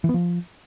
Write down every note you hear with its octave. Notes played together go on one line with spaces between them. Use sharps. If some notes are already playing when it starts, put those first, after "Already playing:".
E3
B3
F3